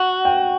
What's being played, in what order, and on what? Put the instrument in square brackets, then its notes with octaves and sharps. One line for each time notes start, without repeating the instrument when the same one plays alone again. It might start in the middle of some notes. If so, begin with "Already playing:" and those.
Already playing: [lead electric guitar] F#4 [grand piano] F#5
[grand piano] G5